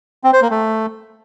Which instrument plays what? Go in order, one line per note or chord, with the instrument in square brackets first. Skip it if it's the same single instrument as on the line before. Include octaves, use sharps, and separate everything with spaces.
[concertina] C4
C5
A#3
A3